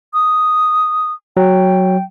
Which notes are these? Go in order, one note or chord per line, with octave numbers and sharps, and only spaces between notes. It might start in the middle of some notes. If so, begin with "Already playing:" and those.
D#6
F#3 G5